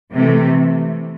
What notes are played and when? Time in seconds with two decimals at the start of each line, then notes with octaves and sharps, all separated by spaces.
0.13 C3 E3 A3